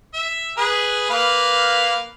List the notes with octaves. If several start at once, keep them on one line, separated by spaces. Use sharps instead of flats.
E5
G#4 B4
A#3 B4 F5